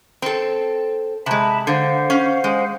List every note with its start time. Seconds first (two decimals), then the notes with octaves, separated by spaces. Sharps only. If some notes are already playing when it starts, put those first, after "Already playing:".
0.22 C4 A4
1.26 C3 G#3 E5 A5 B5
1.67 D3 C5 F5 F#5
2.10 C#4
2.44 G#3